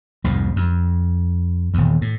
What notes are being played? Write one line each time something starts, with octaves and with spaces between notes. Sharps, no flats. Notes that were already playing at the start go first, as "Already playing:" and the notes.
C2 F2 G#2
F2
D#1 E2
A2